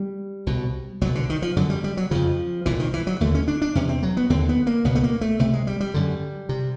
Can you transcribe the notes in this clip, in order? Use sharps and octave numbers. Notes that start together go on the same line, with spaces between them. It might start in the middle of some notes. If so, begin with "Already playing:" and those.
Already playing: G3
C2 B2
C2 B2 F#3
D3
D#3
F3
F#2 D3 F#3
G3
G3
F#3
F2 C#3 F3
C2 A#2 E3
D#3
E3
F#3
D#2 D3 A3
C#4
D4
D4
E2 C3 C#4
C4
F#3
B3
D#2 D3 C4
B3
A#3
C#2 B2 B3
A3
A#3
A3
C2 C3 A3
G#3
G3
G3
F#2 D3
C3